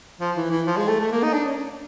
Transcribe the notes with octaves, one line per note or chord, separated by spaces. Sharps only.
F3
E3
E3
F3
G#3
A3
A3
A#3
D#4
D4
C#4